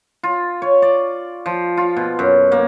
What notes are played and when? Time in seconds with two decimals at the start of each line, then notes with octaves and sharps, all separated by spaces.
0.23 F4
0.62 C#5
0.82 D5
1.46 F3
1.77 F4
1.96 B2
2.19 F#2
2.52 A#3